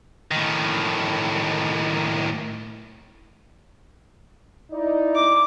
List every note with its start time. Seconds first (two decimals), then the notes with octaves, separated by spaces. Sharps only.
0.31 A2 D#3
4.72 D#4 E4 D5
5.15 D6